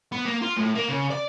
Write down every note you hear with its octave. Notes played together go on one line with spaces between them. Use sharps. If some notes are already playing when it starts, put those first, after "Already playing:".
B3
A#3
F4
A2
A#3
C#3
D5